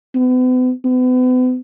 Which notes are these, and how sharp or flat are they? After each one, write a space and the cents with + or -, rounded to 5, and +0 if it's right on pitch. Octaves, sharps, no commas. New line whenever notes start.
B3 +40
B3 +40